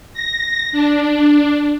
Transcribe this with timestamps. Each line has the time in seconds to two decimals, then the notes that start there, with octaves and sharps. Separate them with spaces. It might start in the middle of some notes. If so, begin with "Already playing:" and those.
0.14 A#6
0.72 D4